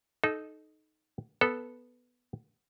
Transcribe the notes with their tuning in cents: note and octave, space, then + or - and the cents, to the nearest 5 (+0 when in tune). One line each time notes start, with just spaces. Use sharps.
D#4 -5 A4 -25
B3 +0 A4 -5